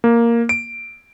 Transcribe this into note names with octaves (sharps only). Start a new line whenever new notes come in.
A#3
D7